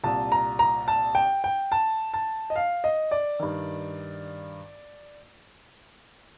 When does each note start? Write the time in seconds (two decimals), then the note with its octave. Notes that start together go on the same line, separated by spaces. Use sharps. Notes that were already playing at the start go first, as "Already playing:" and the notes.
0.04 C2 A#2 A5
0.32 A#5
0.59 A#5
0.88 A5
1.15 G5
1.44 G5
1.72 A5
2.14 A5
2.50 D#5
2.56 F5
2.84 D#5
3.11 D5
3.40 G2 D#3